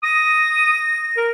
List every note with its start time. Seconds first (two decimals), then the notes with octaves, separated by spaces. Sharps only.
0.03 D#6 A#6
1.17 A#4